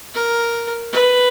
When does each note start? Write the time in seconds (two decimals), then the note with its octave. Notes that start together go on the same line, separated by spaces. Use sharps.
0.14 A#4
0.93 B4